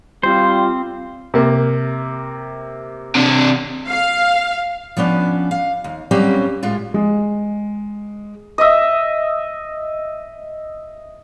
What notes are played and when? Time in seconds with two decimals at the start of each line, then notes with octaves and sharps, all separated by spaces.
0.23 G3 C4 F4 C5
1.34 C3 A#3
3.15 C3 D4
3.89 F5
4.97 F3 B3 C#4 D4
5.51 F5
5.84 D#2
6.11 F#3 G3 A#3 C4 C#4 G4
6.63 A2 G#3 F4
6.94 G#3
8.58 D#5 E5